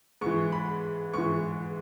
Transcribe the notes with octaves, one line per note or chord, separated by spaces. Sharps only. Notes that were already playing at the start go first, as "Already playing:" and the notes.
G#2 E3 C#6
B5
G#2 E3 C#6